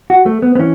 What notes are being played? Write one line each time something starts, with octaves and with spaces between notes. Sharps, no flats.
F#4
A3
B3
B3
E3 C#4